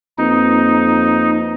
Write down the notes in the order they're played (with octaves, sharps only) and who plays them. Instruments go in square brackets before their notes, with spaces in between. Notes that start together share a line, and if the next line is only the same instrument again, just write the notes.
[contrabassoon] F2 [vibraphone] A#3 B4 [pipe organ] D#4